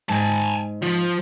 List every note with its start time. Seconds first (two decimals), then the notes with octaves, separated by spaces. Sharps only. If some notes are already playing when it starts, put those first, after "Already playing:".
0.09 G#2 G#5 A5
0.83 F3